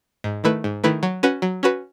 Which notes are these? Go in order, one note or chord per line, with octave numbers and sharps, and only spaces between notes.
G#2
D#3 A3 E4 B4
G#2
D#3 A3 E4 B4
F#3
C#4 F#4 B4
F#3
C#4 F#4 B4